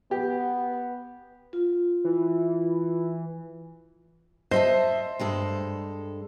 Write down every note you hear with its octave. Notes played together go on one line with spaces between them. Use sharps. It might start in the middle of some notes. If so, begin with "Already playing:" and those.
B3 G4
F4
E3
C5 D#5 E5 A5
G2 G#3 A4